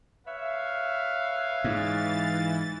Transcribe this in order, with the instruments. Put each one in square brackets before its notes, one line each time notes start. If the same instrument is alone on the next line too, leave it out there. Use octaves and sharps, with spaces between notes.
[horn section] B4 C#5 E5 [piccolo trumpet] F5
[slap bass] G#2 [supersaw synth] E3 A6